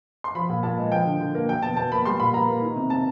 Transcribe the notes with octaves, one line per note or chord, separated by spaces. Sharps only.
C6
F3 B5
A#2
A#2 A5
G#3
F3 G5
D3
D3
A#3
F#3 G5
B2 A5
B2 A5
A#3 B5
G3 C6
A#2 B5
A#2 A#5
A#3
D#3
C3
C3 A5